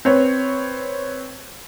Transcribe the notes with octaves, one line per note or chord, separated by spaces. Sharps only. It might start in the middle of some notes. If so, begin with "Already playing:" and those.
C4 B4 C#5